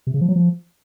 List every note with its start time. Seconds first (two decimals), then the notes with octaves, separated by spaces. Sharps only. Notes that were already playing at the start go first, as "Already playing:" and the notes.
0.07 C3
0.14 C#3
0.21 F3
0.28 F#3
0.36 F3